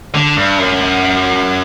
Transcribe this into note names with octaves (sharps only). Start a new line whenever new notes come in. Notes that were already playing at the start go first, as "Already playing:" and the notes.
D3
G2
F#2